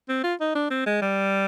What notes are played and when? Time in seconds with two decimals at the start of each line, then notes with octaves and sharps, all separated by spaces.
0.09 C4
0.23 F4
0.40 D#4
0.55 D4
0.70 C4
0.86 G#3
1.01 G3